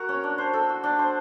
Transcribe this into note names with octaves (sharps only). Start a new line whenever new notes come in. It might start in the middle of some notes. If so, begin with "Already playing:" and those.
Already playing: F#4 A#4
C#4
D4
C5
A4
F#4
D4
C5